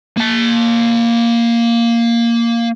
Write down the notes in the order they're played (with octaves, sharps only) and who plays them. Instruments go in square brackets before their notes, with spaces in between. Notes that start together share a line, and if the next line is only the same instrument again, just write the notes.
[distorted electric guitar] A#3 A5